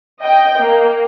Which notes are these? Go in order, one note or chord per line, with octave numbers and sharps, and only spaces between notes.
D#5 G5
A#3